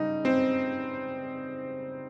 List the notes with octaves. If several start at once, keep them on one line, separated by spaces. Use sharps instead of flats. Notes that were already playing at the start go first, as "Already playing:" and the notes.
Already playing: C#3 G3 D#4
C4